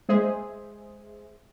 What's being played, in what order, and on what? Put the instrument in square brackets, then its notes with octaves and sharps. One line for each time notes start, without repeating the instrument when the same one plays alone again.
[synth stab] G#3 G#4 C5 E5